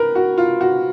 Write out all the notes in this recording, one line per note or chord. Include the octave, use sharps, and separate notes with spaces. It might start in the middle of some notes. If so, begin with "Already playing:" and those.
Already playing: A#4 B4
F#4
F4
F#4